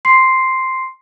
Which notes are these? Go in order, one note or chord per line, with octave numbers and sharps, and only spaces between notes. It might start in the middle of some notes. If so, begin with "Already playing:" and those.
C6 C7